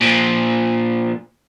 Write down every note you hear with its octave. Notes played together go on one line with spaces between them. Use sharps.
A#2 F3